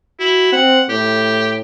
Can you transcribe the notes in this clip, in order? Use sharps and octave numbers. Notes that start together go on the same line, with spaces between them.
E4 F#4
C4 F#5
A2 G4